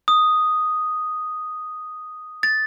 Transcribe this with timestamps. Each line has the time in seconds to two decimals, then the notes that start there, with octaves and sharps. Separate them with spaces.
0.08 D#6
2.43 A6